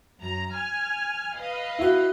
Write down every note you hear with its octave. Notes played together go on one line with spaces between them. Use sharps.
F#2 A#5
G#5 F6
B4 D#5 F5
E4 F#4